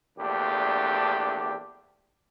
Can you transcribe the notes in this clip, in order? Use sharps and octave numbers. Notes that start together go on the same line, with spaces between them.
A#1 E2 A3 D4 G4